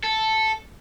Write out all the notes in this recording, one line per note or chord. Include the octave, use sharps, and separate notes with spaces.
A4